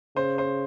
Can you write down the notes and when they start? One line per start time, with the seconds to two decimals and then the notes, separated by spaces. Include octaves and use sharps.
0.16 C#3 C5
0.38 C5